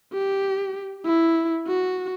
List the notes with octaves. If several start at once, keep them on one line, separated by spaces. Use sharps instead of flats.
G4
E4
F#4